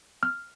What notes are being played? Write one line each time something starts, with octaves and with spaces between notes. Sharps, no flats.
F6